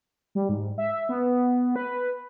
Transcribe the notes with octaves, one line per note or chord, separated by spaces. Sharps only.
G3
G#2
E5
B3
B4